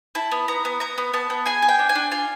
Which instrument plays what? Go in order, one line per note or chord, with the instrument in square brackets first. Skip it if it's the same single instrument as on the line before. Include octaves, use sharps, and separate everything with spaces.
[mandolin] E4 A5
B3
B3 A#5
B3
B3 A#5
B3
B3 A5
B3
G#4 G#5
G#4
G5
D4
G#5
D4
F4 G#5